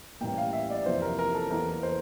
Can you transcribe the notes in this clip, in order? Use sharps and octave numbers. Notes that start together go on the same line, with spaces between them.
A1 A2 G3 A#3 G5
F5
E5
D5
F2 C3 E3 A#3 C5
A#4
A#4
A4
E2 E3 A#3 A#4
C5